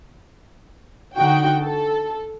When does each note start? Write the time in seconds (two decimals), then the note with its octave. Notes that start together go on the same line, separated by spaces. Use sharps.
1.16 D3 D#4 F#4 G5
1.61 A4